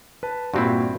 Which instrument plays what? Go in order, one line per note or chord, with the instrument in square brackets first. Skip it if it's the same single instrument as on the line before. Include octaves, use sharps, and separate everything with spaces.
[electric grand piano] B4 A5
[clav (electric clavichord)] G2 C4 E4 [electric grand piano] A#2 F#4